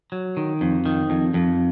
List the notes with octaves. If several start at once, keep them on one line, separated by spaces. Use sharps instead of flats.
F#3
D#3
F2
D#3
F2
F2